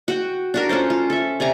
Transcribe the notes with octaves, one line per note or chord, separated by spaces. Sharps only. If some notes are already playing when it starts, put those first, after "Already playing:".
F#4 F#5 G5
D4 F#4 A#4
C#4 F4 A4 C5
F4
A4 E5
C3 D5 G#5 A#5